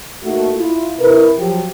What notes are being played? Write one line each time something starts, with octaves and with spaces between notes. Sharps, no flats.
A3 A#3 D#4 F#4 A4
E4 F4
C3 E4 A#4 B4
F3 F#3 G4